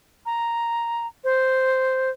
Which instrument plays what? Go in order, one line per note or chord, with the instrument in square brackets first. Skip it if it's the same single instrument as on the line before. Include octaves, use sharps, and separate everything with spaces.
[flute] A#5
C5